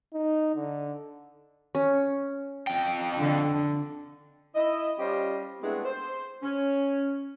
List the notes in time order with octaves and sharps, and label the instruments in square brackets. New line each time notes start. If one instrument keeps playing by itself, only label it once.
[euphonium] D#4
D3
[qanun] C#4
[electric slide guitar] F2 G5
[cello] D3
[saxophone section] E4 D#5
G3 C#4 F4 G4 C5 D#5
G#3 A3 B3 C4 D4 E4
C5
C#4